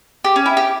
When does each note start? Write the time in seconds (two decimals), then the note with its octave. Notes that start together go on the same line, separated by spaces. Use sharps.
0.25 G4
0.36 C#4
0.46 E4
0.57 G4